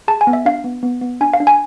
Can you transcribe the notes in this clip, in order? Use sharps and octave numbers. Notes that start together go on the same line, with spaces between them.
G#4 A5
G#5
B3
E5
D4 F5
B3
B3
B3
D4 G#5
F5
D4
G#5